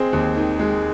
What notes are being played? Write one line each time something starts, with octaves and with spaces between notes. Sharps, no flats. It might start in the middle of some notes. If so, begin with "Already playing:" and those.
Already playing: G#3 C4 G#4
D#2
D#3
G#3